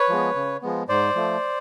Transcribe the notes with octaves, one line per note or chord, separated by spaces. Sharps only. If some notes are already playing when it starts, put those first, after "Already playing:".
Already playing: B4 C#5
F3 G#3 B3
C#3
F3 G#3 B3
G#2 C5 D5
F3 A3